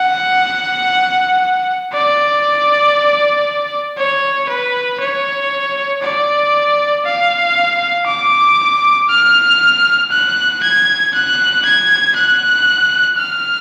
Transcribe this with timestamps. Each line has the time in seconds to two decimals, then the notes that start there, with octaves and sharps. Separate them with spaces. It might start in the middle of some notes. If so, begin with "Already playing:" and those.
Already playing: F#5
1.93 D5
3.98 C#5
4.49 B4
5.00 C#5
6.02 D5
7.05 F5
8.06 D6
9.09 F6
10.11 F#6
10.63 G#6
11.15 F#6
11.65 G#6
12.16 F#6
13.19 F6